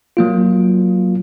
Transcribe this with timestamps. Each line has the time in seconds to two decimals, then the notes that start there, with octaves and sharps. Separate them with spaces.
0.17 F#3 A#3 F4